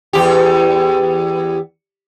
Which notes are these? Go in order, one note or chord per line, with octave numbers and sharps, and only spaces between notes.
E2 G4